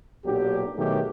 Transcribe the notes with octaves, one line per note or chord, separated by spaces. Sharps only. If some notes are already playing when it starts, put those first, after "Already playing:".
B1 A#2 F#3 D4 G4
B2 D#3 F#3 A3 G4 G#4